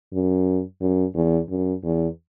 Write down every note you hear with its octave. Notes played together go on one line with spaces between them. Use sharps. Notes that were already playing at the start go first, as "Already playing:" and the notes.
F#2
F#2
E2
F#2
E2